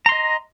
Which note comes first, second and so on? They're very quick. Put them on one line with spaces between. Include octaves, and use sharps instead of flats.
A#5 C6 D#5